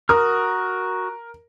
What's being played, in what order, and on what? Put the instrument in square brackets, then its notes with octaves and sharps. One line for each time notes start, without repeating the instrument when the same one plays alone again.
[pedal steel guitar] F#4 D#6 F6 [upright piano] A#4